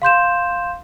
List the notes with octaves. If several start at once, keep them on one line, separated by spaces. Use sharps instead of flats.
F5 C6 G6 E7